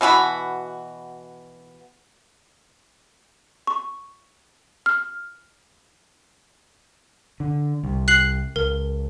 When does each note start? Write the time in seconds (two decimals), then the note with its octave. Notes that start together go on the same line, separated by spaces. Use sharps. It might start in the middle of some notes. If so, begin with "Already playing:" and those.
0.01 B2 E3 F#4 B5
3.67 C#6
4.86 F6
7.40 D3
7.83 C2
8.08 F#6 C7 F#7
8.56 C#2 A#4